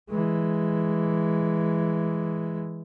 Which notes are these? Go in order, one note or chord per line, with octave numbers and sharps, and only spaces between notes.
E3 G#3